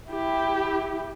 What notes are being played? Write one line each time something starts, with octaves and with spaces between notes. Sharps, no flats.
E4 G4